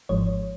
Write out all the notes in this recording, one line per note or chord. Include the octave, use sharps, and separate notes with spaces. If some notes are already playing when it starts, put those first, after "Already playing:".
G#1 G#2 F3 G#3 C#5